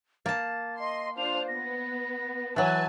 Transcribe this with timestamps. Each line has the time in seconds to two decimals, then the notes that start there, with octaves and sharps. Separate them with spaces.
0.26 A#3 A5 A6
0.79 D#5 C6
1.17 D4 F4 C5 F7
1.48 B3 A#6
2.56 E3 F#3 B4 G#5 A5 A6